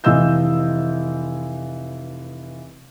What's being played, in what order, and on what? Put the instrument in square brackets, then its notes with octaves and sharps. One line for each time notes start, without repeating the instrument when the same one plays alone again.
[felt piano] F1 E3 F4 D#5 E6 G6